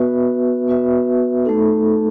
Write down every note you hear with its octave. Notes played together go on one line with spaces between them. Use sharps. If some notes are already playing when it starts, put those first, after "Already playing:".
Already playing: B3 F#4 B4 E5
B3 F#4 B4 E5
A3 D#4 A4